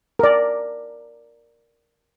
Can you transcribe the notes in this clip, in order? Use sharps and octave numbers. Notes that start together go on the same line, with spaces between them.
A#4 D5